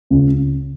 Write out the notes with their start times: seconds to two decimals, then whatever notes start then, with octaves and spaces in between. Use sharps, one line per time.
0.10 C#2